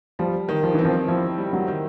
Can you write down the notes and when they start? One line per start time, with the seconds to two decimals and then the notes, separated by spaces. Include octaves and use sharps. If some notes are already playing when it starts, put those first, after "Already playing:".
0.19 F3 G3
0.49 D#3
0.63 F3
0.75 E3 C4
0.85 F3
1.08 F3 E4
1.38 G3
1.53 F#3
1.68 D#3